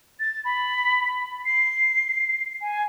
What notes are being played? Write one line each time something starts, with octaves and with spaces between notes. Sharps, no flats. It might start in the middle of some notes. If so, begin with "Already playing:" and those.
A6
B5
C7
G#5